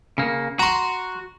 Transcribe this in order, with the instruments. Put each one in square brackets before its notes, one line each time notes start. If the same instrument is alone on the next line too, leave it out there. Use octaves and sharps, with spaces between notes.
[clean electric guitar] C#3 A#3
[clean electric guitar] F#4 [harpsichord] A#5 C6